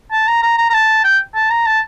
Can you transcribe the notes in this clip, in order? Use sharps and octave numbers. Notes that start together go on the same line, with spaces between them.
A5
A#5
A#5
A#5
A#5
A5
G5
A5
A#5
A5